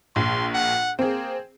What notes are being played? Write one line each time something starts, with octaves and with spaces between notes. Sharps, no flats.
A#1 C6
F#5
A#3 C4 G#4